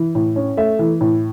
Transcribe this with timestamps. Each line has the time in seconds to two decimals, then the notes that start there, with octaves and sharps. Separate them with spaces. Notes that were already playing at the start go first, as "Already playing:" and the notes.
Already playing: E3
0.15 A2
0.36 C#4
0.57 A3 E5
0.79 E3
1.01 A2